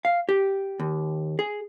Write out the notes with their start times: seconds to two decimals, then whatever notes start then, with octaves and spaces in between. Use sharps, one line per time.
0.05 F5
0.29 G4
0.80 D#2
1.39 G#4